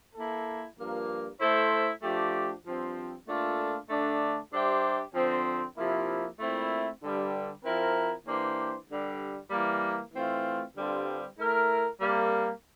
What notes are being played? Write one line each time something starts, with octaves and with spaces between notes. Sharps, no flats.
A#3 E4 A4
G2 F3 A#3
A3 E4 A4 C5
F3 A3 D4 G4
G2 F3 C4
A#2 A3 D4 F4 A4
D3 A3 D4
G3 D4 G4 C5 E5
D3 F3 C4
C3 F3 A#3 E4
A#2 A3 C4 E4
G2 D3 G3
F3 C4 E4 A#4
E3 A#3 D4 G4 C5
G2 D3 G3
E3 G3 A#3
E3 A3 C4 F4
G2 D3 G3 C4 F4
A3 E4 A#4
C3 G3 A#3